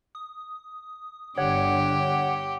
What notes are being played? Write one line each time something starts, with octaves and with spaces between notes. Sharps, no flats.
D#6
G1 D3 G4 C#5 F#5